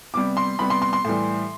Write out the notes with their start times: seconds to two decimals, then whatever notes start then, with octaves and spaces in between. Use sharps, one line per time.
0.14 C3 G3 B3 D6
0.37 C6
0.59 C3 G3 B3 B5
0.70 C6
0.82 C6
0.93 C6
1.05 A2 E3 G3